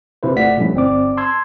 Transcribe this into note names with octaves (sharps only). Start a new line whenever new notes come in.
C3 E4 B4 C5
G1 A3 F4 D5 F#5 B6
B2 F3 G3 A3 C#4 E4
G1 C4 D5 D6
A5 C6 E6 G#6